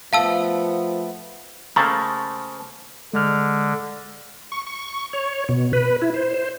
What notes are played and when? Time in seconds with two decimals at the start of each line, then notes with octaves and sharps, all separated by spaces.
0.13 F3 A3 B3 F5 A5 E6
1.76 C#3 A3 A#3 C5 A5
3.14 D3 G#3 F6
4.52 C#6
4.67 C#6
5.13 C#5
5.49 B2
5.73 B4
6.02 E4
6.14 C5
6.34 C5